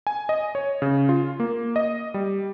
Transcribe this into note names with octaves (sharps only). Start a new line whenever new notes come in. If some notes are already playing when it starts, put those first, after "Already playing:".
G#5
D#5
C#5
C#3
F4
A#3
D#5
G3